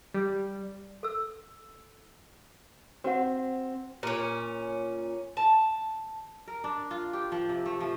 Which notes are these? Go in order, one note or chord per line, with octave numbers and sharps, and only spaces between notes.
G3
A4 E6
C4 F#4 F#5
A#2 C#4
A5
A#4
D4
F4
G4
F3
C3
A3
F3